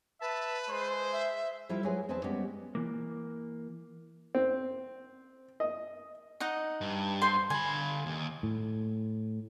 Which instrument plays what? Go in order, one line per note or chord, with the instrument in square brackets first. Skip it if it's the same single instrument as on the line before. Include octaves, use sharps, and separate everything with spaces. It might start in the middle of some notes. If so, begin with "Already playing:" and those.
[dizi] B4 [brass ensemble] E5 A5
[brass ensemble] G#3 C5
[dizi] E5
[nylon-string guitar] F3 G3 E4 F4 A4 E5
F#3 G#3 G#4 B4 C5
E2 C4 G#4 B4 E5 A5
G3 G#3 B3 C#4 F#4 G4
[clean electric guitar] E3 A#3
[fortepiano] C4
D#5
[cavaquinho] D#4 D#5 F#5
[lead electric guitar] G2
[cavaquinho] C5 C6
[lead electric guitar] D3 B5 [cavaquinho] G#5
[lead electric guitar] D#2
[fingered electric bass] A2